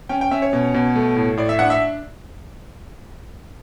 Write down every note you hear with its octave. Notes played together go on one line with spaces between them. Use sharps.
C#4 G5
G5
C#4 E5
C#5
B2
B2
A3
A2
A2 D5
E5
D4 F#5
E5